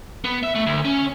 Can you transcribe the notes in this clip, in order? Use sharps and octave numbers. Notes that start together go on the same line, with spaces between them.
B3
E5
A3
D2
C#4